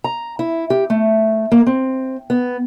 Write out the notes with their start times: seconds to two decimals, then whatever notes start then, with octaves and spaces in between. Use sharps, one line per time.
0.04 A#5
0.39 E4
0.70 G4
0.90 A3
1.52 A#3
1.67 C4
2.30 B3